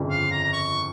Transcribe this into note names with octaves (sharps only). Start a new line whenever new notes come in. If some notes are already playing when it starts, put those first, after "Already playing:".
Already playing: G1 F2 C#3 F3
F5
A#5
A#5
C#6